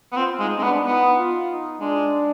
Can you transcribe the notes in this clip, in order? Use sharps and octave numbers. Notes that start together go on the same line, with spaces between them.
B3
C4 F4
G#3 D#4
G#3 C4
B3 D4
B3 D#4
F4
D#4
G#3 D4